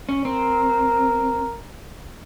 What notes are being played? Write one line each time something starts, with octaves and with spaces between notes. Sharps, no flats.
C#4
C4 A#4